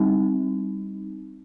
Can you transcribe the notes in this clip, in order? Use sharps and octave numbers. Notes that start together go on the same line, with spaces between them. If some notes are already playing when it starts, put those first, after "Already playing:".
Already playing: G3 C4 D#4